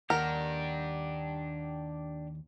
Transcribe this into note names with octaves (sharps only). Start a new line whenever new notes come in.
D#2 D4 G4 A#4 F#5 A#6